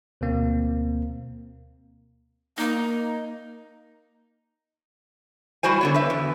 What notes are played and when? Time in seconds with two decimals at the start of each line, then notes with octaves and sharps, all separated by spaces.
0.21 D2 B2 A#3 C4
2.58 A#3 D#4
5.63 G3 E4 F#4 C5 G#5
5.81 D3 B3 C#5
5.94 B4 E5
6.10 E2